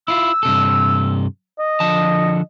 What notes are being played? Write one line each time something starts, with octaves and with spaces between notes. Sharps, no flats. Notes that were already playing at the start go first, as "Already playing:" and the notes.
E4 F4 E6
G2 C3 A4
D#5
D3 F3 A5